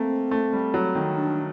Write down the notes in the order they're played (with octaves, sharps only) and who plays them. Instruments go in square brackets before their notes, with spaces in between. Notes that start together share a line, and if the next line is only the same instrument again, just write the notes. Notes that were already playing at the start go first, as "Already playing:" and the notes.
Already playing: [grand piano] A3 A#3 [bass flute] C4
[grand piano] A3
G3
F#3
D#3
[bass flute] D4